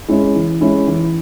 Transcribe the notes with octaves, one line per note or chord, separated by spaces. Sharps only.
G#3 C#4 E4
E3
G#3 C#4 E4
E3